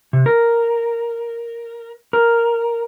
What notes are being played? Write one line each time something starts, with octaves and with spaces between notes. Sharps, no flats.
C3
A#4
A#4